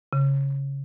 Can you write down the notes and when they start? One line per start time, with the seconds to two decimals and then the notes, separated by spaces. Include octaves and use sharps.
0.13 C#3